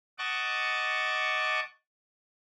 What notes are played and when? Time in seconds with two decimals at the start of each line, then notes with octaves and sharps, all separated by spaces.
0.18 D#5 F#5 A5 C#6 D6